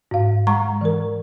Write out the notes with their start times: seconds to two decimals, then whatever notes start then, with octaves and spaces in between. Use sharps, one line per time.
0.11 G#2 F5
0.47 G#3 A#5 C#6
0.81 E3 A#4